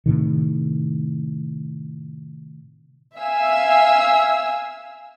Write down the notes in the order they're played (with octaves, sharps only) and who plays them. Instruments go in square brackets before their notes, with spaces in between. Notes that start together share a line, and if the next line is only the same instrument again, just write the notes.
[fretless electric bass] A2 C3 D#3
[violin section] E5 F5 G#5 E6